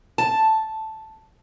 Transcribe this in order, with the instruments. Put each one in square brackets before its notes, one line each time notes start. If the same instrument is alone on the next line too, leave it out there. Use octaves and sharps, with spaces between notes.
[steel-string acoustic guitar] A5